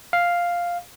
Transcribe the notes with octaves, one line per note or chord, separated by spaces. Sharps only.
F5